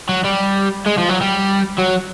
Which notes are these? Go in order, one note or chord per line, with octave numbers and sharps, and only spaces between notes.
F#3
G3
G#3
F3
F#3
G3
F#3